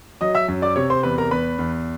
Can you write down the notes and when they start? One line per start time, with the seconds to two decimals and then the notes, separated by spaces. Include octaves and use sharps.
0.21 F#3 D#5 D#6
0.35 E5 E6
0.48 F#2
0.62 D5 D6
0.76 C3 C#5 C#6
0.90 C5 C6
1.03 E2 B4 B5
1.18 A#4 A#5
1.31 E2 B4 B5
1.59 E2